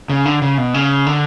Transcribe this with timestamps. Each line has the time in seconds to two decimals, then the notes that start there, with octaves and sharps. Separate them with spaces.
0.10 C#3
0.25 D3
0.42 C#3
0.58 B2
0.74 C#3
1.07 D3